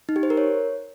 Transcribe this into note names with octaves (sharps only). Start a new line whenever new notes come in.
D#4
G4
C5
A#4
C#5